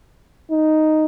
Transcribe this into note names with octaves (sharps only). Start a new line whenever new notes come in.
D#4